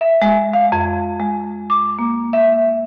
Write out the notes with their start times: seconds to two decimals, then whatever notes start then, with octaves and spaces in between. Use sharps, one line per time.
0.01 E5
0.22 G#3
0.54 F5
0.72 F2
1.20 G#3
1.70 D6
1.99 A#3
2.33 E5